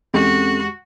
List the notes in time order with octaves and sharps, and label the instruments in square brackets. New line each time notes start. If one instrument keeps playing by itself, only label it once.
[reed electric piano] E2 G#3 G4 [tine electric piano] C4 C#4 A4 [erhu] F#4